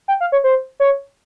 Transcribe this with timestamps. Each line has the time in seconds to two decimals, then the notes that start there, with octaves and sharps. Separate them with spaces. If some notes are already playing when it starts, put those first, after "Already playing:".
0.08 G5
0.21 F5
0.32 C#5
0.44 C5
0.80 C#5